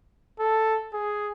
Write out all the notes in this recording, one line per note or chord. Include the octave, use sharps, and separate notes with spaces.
A4
G#4